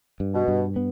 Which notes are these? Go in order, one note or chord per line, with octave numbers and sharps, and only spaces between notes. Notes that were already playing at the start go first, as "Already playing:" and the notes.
G2
B2
G2
B3